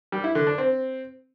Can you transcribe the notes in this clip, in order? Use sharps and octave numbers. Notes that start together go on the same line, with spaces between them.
G3
E4
D3
D4
C4